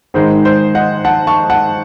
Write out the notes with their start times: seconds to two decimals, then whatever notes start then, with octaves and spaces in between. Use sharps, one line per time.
0.14 G#2 D#3 G#3 C5
0.45 C5
0.75 D#5 F#5
1.05 F#5 A5
1.27 A5 C#6
1.50 F#5 A5